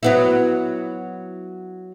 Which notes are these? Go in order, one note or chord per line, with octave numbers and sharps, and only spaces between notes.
F#3 B3 E4